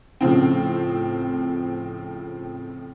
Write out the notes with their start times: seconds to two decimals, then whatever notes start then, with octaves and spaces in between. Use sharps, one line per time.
0.21 A2 C#3 F3 C4